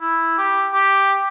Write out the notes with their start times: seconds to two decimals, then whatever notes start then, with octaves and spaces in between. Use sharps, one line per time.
0.01 E4
0.38 G4
0.73 G4